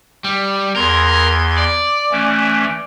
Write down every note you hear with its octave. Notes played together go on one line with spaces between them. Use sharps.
G3
E2 A#4 C6 G#6
D5
E3 A3 C#4